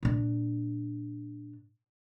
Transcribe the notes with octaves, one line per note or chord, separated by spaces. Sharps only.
A#2 D4